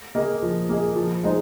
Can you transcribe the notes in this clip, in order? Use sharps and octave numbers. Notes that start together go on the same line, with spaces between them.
A#3 G#4 D#5
F3
A#3 G#4 D#5
F3
G#3 D#4 C5